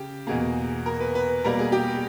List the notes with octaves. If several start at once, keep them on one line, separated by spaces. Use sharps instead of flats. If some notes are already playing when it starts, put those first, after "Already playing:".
Already playing: C#3 G4
E2 B2 A#3 G#4
A#4
B4
B4
B2 G3 A#3 A#4
G#4
G4